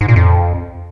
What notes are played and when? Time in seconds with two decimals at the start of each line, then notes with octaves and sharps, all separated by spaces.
0.01 G#2
0.08 A#2
0.16 F2